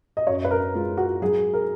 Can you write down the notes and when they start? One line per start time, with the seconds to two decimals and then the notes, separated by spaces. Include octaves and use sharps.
0.17 D#5
0.27 F#2 C#5
0.45 B4
0.51 A#4
0.74 G#3 F4
0.97 F#4
1.22 F#3 G#4
1.53 A#4